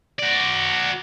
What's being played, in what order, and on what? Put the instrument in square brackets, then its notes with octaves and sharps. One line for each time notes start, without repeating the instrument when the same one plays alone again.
[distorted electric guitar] F#4 D5